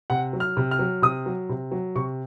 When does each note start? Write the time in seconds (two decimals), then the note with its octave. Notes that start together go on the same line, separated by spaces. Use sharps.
0.10 C3 F#5
0.33 F#3
0.40 F6
0.57 C3
0.71 F6
0.79 F#3
1.02 C3 D#6
1.26 F#3
1.49 C3
1.71 F#3
1.95 C3 C#6